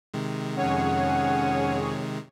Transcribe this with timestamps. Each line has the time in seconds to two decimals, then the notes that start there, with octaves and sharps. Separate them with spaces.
0.14 C3 D#3 G#3
0.57 F2 C#4 G#4 C#5 F#5